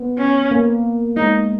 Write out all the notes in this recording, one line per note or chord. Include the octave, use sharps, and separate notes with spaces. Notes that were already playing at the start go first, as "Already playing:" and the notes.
Already playing: B3
C#4
A#3
G#3 D#4